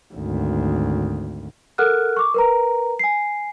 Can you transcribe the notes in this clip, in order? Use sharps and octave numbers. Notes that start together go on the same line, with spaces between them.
G#1 D2
A4 A#4 F#5 F6 F#6
C#6 D6
A#4 B4 A#5
G#5 C7